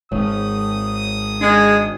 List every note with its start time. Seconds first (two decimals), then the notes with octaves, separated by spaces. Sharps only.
0.12 G#1 G#2 C#5 D#6
1.41 G#3 D4